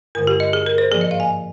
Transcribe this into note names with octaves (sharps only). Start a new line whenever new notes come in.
G2 D3 G#3 A#4
G4
D#5
G#4
A#4
C5
G#2 F3 A#3 G#4
D#5
F5
G#5